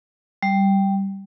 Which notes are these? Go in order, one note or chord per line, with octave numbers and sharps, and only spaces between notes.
G3